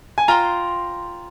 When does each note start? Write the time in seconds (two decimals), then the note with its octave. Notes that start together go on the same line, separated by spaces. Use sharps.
0.18 G#5
0.28 F4 C5 G5 A#5 C6